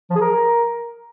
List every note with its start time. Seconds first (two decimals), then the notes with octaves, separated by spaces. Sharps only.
0.10 F3
0.16 G#4
0.21 A#4